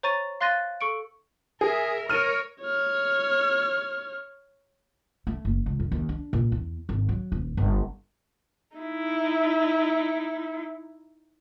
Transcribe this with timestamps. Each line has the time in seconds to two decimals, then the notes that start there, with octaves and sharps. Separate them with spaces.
0.03 C5 C#5 A#5 C#6 A6 D#7
0.41 F5 C6 F#6 A6 A#6 D#7
0.81 A4 C#6 C#7 D7
1.61 G#4 A#4 E5
2.09 A#4 C#5 F6 D#7
2.63 C#5 F6
5.27 A3
5.45 F#1
5.66 C#2
5.80 F#2
5.92 D#2
6.09 D4
6.33 A#2
6.52 E2
6.89 G#1
7.09 F#3
7.32 D#1
7.57 G1
8.76 D#4 E4